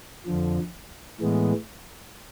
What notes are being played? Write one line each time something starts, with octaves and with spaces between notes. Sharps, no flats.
F2 D3 F3
A2 E3 G#3 B3